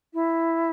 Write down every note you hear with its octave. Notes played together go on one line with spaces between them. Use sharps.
E4